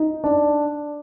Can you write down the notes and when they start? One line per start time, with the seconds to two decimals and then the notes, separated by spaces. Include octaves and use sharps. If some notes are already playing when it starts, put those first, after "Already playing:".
Already playing: D#4
0.24 D4